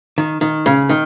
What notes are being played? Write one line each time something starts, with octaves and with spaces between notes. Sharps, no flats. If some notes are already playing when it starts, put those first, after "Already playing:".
D#3
D#3
C#3
D#3